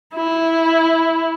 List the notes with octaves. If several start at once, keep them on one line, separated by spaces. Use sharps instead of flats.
E4